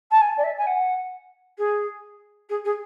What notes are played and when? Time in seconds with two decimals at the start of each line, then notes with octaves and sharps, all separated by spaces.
0.11 A5
0.21 G#5
0.37 D5
0.43 E5
0.58 G#5
0.66 F#5
1.58 G#4
2.49 G#4
2.64 G#4